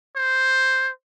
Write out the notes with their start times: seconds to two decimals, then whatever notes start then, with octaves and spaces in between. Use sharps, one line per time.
0.16 C5